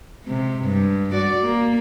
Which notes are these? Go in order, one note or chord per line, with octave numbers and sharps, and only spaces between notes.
C3 G#3
G2
F#4 D5
A#3